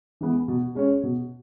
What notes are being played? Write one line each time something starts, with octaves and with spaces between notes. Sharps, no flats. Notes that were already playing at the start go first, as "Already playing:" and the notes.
E3 G#3 B3
B2
G#3 C#4 G#4 C#5
B2